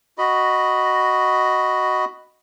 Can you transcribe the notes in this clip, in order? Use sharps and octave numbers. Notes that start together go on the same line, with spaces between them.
F#4 D#5 B5